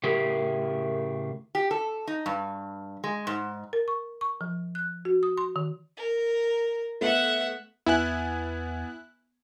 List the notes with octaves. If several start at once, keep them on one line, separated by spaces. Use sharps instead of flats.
A2 C#3 G4 G#4 A#4
G4
A4
D#4
G2
G#3
G#2
A#4
C#6
C#6
F3
F#6
F#4
D#6
C6
D#3
A#4
A3 B3 E5 F#5
E2 B3 E4 G#5 F#6